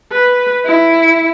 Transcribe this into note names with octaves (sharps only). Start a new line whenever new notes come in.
B4
E4